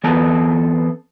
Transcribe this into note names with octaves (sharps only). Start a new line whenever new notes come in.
E3 B3 C4 A4 B4 A5